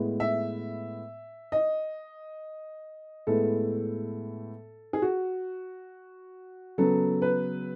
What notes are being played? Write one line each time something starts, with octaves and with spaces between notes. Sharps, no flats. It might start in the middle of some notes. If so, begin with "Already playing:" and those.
Already playing: A2 G#3 B3
E5
D#5
A2 G#3 B3 A4
G#4
F#4
C#3 F#3 B3 A4
B4